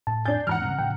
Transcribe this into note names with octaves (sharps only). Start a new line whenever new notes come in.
A2 A5
F2 D4 G#5 G6 A6
E2 G#2 E3 F#5 A#5 F6
C#3 G3 C4
A2 C#3 F3 G5